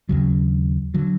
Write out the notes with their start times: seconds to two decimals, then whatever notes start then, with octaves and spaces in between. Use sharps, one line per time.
0.09 D#2 C#3 F#3
0.94 D3 F#3